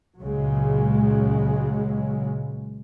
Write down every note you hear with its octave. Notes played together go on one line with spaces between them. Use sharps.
C#2 A#2 C#3 F#3 G#3